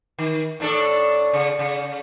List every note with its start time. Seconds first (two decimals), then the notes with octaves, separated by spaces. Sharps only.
0.18 D#3
0.60 A2 D4 A4
1.33 C#3
1.59 C#3